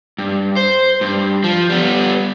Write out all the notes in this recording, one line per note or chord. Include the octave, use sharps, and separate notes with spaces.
G2
C5
G2
F3
G3 B3